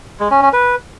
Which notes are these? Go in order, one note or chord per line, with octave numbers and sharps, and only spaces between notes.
G#3
C#4
C#4
B4